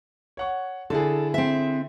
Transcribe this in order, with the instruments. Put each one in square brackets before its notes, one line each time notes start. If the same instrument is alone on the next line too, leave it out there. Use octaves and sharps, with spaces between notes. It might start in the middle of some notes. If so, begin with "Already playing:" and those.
[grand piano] C#5 F#5 C#6
[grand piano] D3 E4 G#4 [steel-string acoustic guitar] A4
[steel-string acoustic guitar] C4 E5